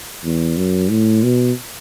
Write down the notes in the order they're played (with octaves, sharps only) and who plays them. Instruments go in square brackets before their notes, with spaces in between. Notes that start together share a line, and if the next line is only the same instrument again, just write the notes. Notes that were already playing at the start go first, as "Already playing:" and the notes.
[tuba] E2
F#2
A2
B2